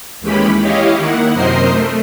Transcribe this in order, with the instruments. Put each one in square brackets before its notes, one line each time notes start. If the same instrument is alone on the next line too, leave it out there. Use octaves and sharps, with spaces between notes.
[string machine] D#2 E3 G#3 C#4 G4 B5
E4 G4 C#5 D#5 F5
D#3 A#3 E4 F#5
F#2 C3 A#4 C5 D#5 C7
A3